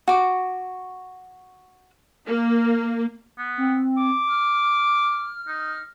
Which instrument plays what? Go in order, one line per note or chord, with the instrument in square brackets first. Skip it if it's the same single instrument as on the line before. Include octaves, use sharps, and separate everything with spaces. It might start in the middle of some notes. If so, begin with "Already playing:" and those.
[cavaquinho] F#4 D6
[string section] A#3
[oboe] B3
[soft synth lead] C4
[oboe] D6
[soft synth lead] F6
[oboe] D#4